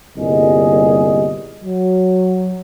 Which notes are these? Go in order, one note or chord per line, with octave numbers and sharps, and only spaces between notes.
G1 C2 A#2 G3 G#4 D#5
F#3